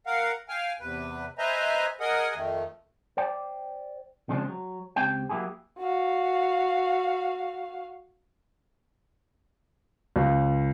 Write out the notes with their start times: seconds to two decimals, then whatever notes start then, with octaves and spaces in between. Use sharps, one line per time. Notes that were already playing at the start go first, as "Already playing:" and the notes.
0.06 A#4 F5 F#5
0.49 F5 G5 G#5 F6
0.80 E2 C3 B4
1.38 B4 C5 D#5 E5 G#5 A#5
2.00 G#4 A#4 D#5 F#5 G#5 D#6
2.35 F2 D#3 A3
3.17 C5 D5 G5
4.29 C#3 F3 G#3 A3 C4 D4
4.48 F#3
4.96 C#2 C4 G4 G5
5.29 F#3 A#3 E4 G4 G#4
5.78 F#4 F5
10.16 C#2